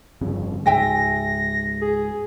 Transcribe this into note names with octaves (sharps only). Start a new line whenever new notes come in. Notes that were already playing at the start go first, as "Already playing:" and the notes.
G1 F2 C#3
C#2 G#2 G#3 E5 G5 G#5 A#6
G#4